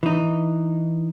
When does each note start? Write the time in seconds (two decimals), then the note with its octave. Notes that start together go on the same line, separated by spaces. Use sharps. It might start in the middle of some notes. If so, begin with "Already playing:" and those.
0.03 E3 D#4